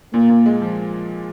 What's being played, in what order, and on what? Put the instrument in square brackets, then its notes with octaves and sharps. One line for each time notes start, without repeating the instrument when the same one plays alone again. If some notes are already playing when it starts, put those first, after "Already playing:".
[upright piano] A#2 [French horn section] A#3
[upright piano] A#2
G#3
F3